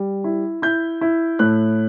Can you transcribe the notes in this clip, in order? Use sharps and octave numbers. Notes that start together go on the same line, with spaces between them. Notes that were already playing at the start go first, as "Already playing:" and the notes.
Already playing: G3
E4
E4 G6
E4
A2 F#6